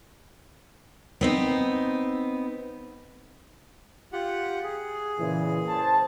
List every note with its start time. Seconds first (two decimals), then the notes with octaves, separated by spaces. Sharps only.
1.21 B3 C4 D#4
4.13 F4 G4 F#5
4.63 G#4
5.18 A#2 C#3 E3
5.68 C5 A5